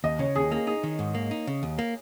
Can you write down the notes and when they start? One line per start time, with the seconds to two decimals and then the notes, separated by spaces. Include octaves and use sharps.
0.04 D#2 D#5
0.19 C#3 C#5
0.35 D#2 G#4
0.51 A#3 G#4
0.67 D#4 G#4
0.83 D#3
0.99 G#2
1.15 A#3
1.31 D#4
1.47 C#3
1.63 D#2
1.79 A#3